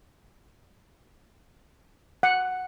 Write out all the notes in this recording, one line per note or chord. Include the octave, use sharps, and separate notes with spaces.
F#5